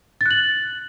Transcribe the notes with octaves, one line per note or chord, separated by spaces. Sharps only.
F#6 A6 F#7